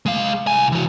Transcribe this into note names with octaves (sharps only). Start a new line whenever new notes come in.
G#3 F5
C2 G#5
E3 F#4